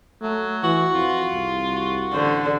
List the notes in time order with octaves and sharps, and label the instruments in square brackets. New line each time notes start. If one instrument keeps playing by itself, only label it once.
[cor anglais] F#3 [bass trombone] A3
[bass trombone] E3 [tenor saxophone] F#4
[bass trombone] F2 [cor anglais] F4
[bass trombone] C2
[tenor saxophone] F#4
[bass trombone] A1 [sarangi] D3 [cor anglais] C5